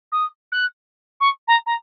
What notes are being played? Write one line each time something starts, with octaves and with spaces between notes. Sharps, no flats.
D#6
F#6
C#6
A#5
A#5